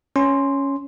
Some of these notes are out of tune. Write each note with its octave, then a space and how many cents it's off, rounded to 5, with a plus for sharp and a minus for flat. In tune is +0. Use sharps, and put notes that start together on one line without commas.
C#4 +0 C6 +0